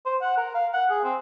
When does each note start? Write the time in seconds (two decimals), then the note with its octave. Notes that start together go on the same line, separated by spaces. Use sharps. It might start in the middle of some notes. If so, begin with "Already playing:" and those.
0.06 C5
0.22 F#5
0.37 A#4
0.54 F5
0.74 F#5
0.91 G#4
1.04 C4